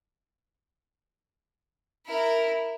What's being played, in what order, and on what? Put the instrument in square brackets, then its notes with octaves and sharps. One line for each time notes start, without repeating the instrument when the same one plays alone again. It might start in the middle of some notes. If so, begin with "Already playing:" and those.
[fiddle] E4 A#4